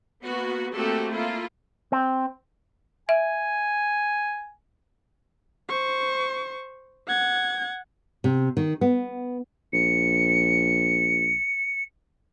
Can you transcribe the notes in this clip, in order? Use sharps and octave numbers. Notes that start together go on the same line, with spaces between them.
A#3 B3 F#4
A3 A#3 C4 F#4 G4 A4
A#3 E4 F4 A4
C4
E5 G#5
C5 C#6
F#5 G#6
C3
D#3
B3
A#1 C#7